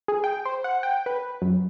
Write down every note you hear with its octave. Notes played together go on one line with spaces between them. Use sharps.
G#4
G5
C5
F#5
G5
B4
F#2